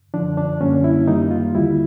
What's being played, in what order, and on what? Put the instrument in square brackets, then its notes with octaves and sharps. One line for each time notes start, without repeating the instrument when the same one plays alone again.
[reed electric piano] F#2 D3 F3 D4
D4
F#2 D3 G3 A#3 C#4
E4
F#2 D#3 G3 A#3 D#4
F4
D#2 D3 G3 E4